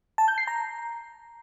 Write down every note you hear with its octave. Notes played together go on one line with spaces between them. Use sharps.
A5
G6
C7
A#5